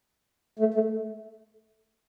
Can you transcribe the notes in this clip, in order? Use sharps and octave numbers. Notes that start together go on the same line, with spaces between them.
A3
A3